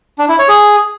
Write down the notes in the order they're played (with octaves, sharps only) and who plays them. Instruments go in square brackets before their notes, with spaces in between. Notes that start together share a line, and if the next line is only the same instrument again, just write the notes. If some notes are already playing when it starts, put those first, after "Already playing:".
[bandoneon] D4
E4
C#5
G#4